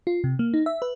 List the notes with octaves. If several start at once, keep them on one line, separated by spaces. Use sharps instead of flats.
F4
C3
A#3
D#4
E5
B4